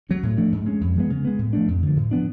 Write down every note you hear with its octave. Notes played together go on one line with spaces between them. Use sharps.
F#3 C#4
A2
F3 A3 D4
G#2
G#3 C#4
F2
F3 G#3 B3
C#3
G#3 B3
A2
F3 A3 D4
F2
D3 F3
A2
F3 B3 D4